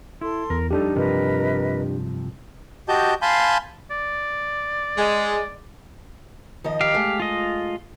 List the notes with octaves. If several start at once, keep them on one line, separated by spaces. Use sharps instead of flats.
E4 A4 C6
E2 A#4
F2 G3 D4 D#4 G4 A4
G2 C3 F3 A#4 B4 D#5
F#4 G4 D#5 A5 G6
F5 G#5 A5 B5 C6 G6
D5
G#3
D#3 F3 D#5
G4 F5
G#3 A3
F4 D#5